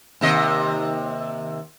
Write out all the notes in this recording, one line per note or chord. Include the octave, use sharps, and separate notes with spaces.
D#2 C3 D#5